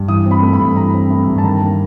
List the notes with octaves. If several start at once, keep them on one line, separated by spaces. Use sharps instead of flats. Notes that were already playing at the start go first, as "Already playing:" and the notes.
Already playing: G2
E3 D#6
C4
B5
A3
B5
G2
E3 A#5
C4
A3
G2
A5
D#3 A#5
A#3